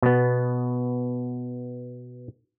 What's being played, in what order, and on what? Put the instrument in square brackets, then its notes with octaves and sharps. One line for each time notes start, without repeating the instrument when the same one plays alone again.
[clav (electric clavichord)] B2 B3